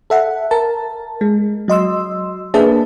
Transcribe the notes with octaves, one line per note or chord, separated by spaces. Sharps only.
A4 E5 F#5
A#4 A5
G#3
F#3 D#5 C6 E6
A#3 D4 G#4 B4 E5 A5